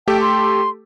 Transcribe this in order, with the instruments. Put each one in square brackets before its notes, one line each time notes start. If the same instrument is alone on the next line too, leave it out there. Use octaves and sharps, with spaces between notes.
[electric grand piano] A3 G4 A4 [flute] G5
[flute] C6